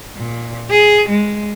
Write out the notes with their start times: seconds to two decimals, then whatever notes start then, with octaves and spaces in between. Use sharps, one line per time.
0.16 A#2
0.71 G#4
1.09 G#3